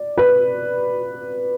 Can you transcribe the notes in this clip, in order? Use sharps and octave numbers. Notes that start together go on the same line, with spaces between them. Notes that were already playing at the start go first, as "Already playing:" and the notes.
Already playing: D5
B4